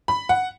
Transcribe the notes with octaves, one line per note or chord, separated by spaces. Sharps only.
B5
F#5